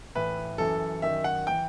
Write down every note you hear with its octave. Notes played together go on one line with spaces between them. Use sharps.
A2 E3 B4
F#2 E3 A4
F#2 D#3 E5
F#5
E3 G5